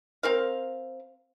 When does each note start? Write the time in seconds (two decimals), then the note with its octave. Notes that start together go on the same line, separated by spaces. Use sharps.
0.23 C4 A#4 F5